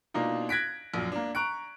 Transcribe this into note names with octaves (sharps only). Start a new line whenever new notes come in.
B2 A#3 D4 D#4 F4
F#6 G#6 A#6 B6 D7
A#1 F#2
A#3 D4
A#5 C#6 F#6 D7